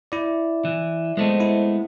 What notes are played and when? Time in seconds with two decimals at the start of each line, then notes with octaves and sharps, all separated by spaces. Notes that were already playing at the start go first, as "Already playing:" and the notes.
0.12 E4 D5 E5
0.65 E3
1.17 G#3 A3 B3 C5 D#5 A5
1.40 E4